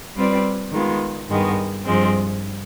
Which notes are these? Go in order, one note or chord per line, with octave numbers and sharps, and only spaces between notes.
G3 C4 F4 B4 D5
D#3 G#3 B3 F4
G2 D#3 G#3 B3
G2 F3 G#3 C4